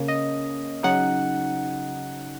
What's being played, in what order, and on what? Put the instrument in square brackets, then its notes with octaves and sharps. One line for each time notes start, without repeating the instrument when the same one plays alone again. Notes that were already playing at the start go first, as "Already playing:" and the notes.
Already playing: [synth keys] C#3 A#3 C#4
D#5
C#3 F#3 D#4 F#5